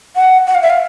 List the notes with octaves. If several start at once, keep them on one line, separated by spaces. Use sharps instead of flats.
F#5
F#5
F5
E5
F5